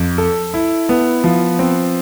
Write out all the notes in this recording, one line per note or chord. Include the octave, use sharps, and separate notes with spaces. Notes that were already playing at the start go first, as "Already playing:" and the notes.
Already playing: F2
A4
E4
B3
F3
C4